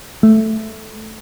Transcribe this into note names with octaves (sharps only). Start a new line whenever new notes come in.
A3